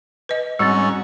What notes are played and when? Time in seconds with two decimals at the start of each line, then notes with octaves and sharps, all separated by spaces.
0.29 B4 D#5
0.59 G#2 G3 C4 C#4 F#4